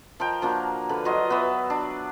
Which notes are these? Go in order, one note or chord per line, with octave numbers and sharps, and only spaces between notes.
F3 A#4 G5
F3 A#3 D4 F#4
D3 B4
F#3 F4 D#5
B3 F#4 E5
D4